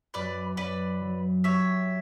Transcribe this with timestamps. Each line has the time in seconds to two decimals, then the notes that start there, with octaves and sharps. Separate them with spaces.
0.14 F#2 B4 D5
0.57 F#2 B4 D5
1.01 F#3
1.44 G4 C#5 E5